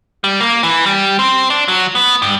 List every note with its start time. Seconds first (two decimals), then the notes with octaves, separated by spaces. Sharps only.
0.24 G3
0.41 A#3
0.63 E3
0.86 G3
1.19 C4
1.50 D4
1.68 F#3
1.95 B3
2.22 G2